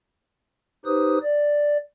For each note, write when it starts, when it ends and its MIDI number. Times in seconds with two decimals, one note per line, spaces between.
0.86 1.18 63
0.86 1.18 67
0.86 1.18 71
0.86 1.18 72
0.86 1.18 87
1.23 1.77 74